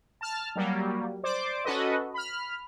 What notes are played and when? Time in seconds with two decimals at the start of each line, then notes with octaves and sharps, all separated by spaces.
0.21 A5 F6
0.56 F#3 G3 A#3
1.23 C5 D5 D6
1.64 C#4 F#4 A4 B4 D#5
2.14 B5 F6